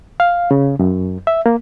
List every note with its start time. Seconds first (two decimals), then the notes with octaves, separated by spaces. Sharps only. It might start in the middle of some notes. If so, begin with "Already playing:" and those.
0.20 F5
0.51 C#3
0.79 F#2
1.27 E5
1.46 A#3